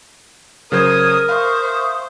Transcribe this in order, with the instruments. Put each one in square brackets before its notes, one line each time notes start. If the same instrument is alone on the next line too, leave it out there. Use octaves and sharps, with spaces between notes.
[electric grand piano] C#3 F#3 C5 [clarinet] A#4 [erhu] D#6 [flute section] G#6
[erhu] C5 [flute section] E5 C#6 D#6 [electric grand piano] F5